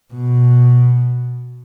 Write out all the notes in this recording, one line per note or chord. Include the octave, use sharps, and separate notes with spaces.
B2